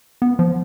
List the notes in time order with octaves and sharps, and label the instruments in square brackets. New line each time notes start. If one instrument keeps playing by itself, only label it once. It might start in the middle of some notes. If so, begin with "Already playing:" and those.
[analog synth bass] B3
F3